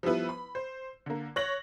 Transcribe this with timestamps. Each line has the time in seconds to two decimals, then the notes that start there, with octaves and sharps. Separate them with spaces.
0.03 F3 G3 B3 E4 B4
0.29 B5
0.55 C5
1.06 D3 A#3
1.36 C#5 F#6 A#6 F#7